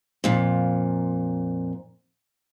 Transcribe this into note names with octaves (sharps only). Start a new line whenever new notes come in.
F2 A#2